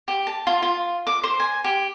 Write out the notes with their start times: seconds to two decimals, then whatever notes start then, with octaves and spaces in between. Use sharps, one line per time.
0.08 G4
0.27 A5
0.47 F4
0.62 F4
1.07 D6
1.23 C5
1.40 G#5
1.64 G4